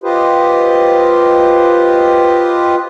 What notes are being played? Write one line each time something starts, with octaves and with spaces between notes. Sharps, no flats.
F4 G4 B4 C5 D#5